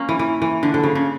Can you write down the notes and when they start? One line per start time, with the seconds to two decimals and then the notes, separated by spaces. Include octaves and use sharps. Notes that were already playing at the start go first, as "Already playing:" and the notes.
Already playing: A#3 C#4
0.09 E3
0.19 E3
0.42 E3
0.63 D3
0.74 D3
0.83 C#3
0.95 C#3